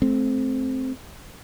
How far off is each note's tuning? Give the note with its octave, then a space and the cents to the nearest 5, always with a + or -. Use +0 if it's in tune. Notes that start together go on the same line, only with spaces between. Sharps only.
A3 -30 C4 +0